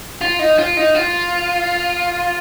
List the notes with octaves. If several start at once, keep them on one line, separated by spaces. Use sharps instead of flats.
F4
D#4
F4
D#4
F4